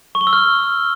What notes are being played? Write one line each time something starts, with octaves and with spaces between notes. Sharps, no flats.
C#6
G7
E6
F6